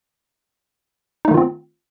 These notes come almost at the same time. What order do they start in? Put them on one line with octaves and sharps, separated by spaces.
D#4 A3 D#3 F4 C4